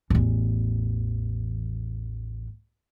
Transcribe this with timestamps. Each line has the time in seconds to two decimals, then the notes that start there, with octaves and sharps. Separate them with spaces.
0.10 A1 E2